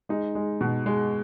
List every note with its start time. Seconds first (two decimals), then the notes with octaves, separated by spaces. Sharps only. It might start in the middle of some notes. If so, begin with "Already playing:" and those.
0.09 G#3 D#4
0.35 G#3
0.61 B2
0.86 G#3